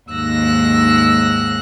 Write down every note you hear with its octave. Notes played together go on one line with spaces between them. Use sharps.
D#2 G#2 E6 F#6 A#6